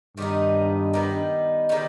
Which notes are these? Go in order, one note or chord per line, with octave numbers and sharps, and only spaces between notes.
G2 D#3 G3 B3 D#4
D#3 G3 B3 D#4
D#3 G3 B3 D#4